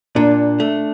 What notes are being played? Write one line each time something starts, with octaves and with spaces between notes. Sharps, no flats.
A#2 D4
A3